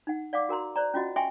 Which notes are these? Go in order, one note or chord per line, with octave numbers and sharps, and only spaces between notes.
D#4 F#5
D5 F5 F#5 D6
F#4 A#4 A#5 C6
C5 D5 A#5
C#4 F4 F#4 D#5 F#5
E5 G5 G#5 C6 C#6